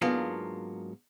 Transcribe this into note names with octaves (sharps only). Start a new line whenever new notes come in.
G#2 F#3 A#3 B3 D4 F4